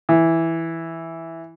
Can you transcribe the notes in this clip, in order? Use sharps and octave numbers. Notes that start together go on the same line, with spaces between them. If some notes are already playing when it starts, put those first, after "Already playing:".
E3